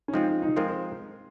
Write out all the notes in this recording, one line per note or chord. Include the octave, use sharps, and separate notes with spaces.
C#4
F3 G#3 C4 D#4 F4
D#4
D#4
F3 G#3 C4 F4 A#4
C5